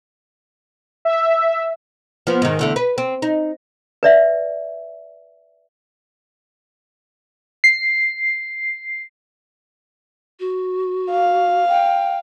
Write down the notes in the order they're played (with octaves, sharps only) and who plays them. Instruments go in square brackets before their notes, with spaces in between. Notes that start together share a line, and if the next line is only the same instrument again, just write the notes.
[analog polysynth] E5
[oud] F3 B3
G#2 D#3
E2 D3 A3
B4
C4
D#4
[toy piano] B4 D5 E5
[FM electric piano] C7
[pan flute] F#4
[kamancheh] F5
[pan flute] G5